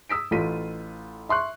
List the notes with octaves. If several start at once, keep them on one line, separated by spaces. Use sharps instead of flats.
D#6 E6 B6 D7
A1 F4 A4 F5 B6 D#7
E5 C6 C#6 F#6